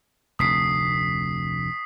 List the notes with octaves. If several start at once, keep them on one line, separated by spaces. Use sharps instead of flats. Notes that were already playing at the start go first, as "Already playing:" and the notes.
F1 D2 D#6 B6 C7